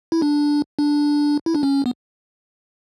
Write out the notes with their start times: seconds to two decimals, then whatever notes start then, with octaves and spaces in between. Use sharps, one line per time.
0.12 E4
0.22 D4
0.79 D4
1.46 E4
1.55 D4
1.63 C#4
1.86 B3